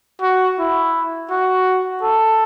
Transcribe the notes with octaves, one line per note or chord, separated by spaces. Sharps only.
F#4
E4
F#4
A4